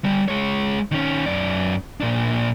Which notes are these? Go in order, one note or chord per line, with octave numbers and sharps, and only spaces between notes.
D3 G3
G#3 C#5
D#3 C#4
F#2 D5
A#2 D4